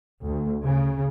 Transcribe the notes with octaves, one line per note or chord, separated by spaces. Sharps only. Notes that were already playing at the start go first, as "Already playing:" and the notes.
D2
C#3